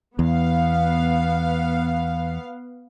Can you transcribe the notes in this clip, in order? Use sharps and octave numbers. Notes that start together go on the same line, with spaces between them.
E2 B3 F5